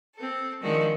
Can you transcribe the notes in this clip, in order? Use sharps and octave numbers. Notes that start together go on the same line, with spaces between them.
C4 A4
D#3 F3 G#3 C4 D4 F#4